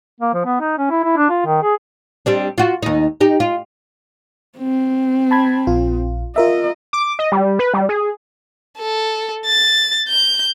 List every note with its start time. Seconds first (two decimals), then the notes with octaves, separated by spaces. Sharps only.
0.20 A#3
0.34 F3
0.45 B3
0.60 D#4
0.78 C#4
0.90 E4
1.04 E4
1.17 D4
1.30 F4
1.46 D#3
1.63 G#4
2.26 G3 C4 D4
2.58 F4 F#4
2.82 D#2 D#4
3.21 D#4 G4
3.40 F4
4.58 C4
5.31 A5 B5 G#6
5.67 A#1 F4
6.36 F4 A#4 D#5 E5
6.93 D6
7.19 D#5
7.32 G3
7.59 B4
7.74 G3
7.89 G#4
8.79 A4
9.46 A6
10.08 G6